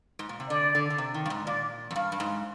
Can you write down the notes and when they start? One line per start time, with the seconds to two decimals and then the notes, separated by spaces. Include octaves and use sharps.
0.19 G#2
0.29 A#2
0.40 C3
0.50 D3 D5
0.75 D3
0.90 D3
0.98 C3
1.14 D#3
1.26 G2
1.30 G#2
1.47 A#2 D5
1.91 F2
1.96 G2 F5
2.12 G2
2.20 G#2